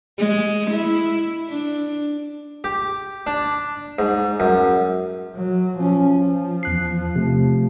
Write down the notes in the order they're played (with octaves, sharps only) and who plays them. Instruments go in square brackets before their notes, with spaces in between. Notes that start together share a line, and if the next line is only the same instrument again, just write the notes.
[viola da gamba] G#3
E4
D4
[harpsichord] G4
D4
G#2
F#2
[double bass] F#3
F3 C#4
F3
[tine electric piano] E2 F#6 C7
C3 A3